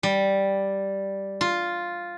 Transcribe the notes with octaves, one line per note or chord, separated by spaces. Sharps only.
G3
F4